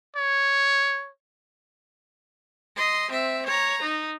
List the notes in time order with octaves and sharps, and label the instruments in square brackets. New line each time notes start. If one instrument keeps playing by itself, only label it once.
[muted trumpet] C#5
[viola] D#5 C6
C4 E5
C#5 A#5
D#4